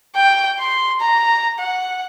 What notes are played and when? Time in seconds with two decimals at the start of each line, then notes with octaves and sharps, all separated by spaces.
0.16 G5
0.60 C6
1.01 A#5
1.59 F#5